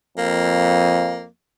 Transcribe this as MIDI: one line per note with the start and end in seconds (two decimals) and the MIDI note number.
0.18 1.27 41
0.18 1.27 58